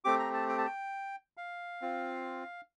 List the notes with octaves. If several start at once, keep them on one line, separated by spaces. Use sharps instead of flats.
A3 C4 G4 D6
A#5
A5
G5
A5
G5
F5
C4 F4